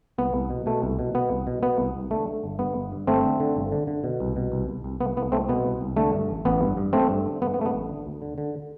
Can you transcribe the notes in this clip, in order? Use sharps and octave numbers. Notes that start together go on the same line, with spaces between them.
C2 B3
C2
B2
B2 A3
C2
B2
B2 B3
C2
B2
B2 B3
C2
C2
D3 A3
D3
G1
G2 B3
G1
G2
G1 A3 C4
D3
D3
G1
D3
D3
B2
C2
B2
C2
C2
C2
C2 B3
C2 B3
C2 A3 C4
B2 B3
C2
C2
D3 A3
G2
A1
A1 B3
G2
G2
A1 A3 C4
G2
D3
G2 B3
B3
G2 A3
B3
A1
D3
D2
D3
D3